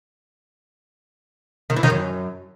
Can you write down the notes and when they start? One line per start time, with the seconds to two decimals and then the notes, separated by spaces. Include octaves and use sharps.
1.70 D#3
1.76 E3
1.83 D#3
1.90 F#2